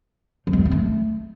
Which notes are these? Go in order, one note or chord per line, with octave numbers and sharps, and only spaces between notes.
F3
G#3
C#4
C4
A3